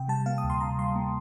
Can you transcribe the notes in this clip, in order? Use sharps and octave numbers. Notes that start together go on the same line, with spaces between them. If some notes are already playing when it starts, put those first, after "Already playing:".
Already playing: C3 G5
G3 A5
A#3 F5
D#6
D2
C6
C3 A#5
G3 C6
A#3